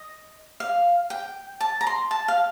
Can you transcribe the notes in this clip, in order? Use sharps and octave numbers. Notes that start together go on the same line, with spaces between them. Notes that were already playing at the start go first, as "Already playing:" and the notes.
Already playing: D#5
F5
G5
A5
A#5
C6
A5
F5